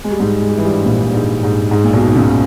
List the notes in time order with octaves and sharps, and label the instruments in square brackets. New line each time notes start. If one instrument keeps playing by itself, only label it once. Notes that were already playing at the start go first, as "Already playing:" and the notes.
[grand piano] G#3
G3
G#2 G#3
G#3
G3
E3
G2 G3
A#1 A#2
G#2
G#2
G#2
A#2
B1 B2
C#2 C#3